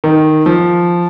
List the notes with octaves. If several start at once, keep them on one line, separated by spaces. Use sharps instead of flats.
D#3
F3